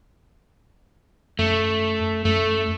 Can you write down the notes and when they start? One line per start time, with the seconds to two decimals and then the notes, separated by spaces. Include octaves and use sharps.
1.39 F#2 A3
2.25 F#2 A3